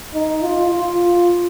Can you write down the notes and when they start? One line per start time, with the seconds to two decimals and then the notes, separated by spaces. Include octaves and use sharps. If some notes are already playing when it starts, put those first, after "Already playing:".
0.14 D#4
0.42 F4
0.71 F4